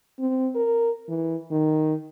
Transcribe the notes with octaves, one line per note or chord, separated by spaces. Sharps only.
C4
A#4
E3
D#3